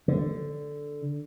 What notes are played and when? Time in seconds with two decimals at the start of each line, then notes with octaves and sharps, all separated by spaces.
0.08 D3